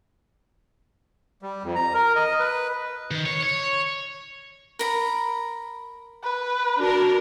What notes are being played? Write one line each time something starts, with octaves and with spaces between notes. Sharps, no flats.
G3
F2
A#5
A#4
D#5
B4
D#3
C#5
C#5
A#4 A#5 B5
B4
D4 F#4 A#4